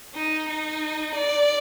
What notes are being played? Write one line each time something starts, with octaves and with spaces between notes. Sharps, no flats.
D#4
D#4
D5